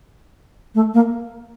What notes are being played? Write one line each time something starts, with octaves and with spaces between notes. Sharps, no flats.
A3
A#3